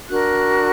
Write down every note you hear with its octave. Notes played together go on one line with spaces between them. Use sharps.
D4 F#4 A#4 F#6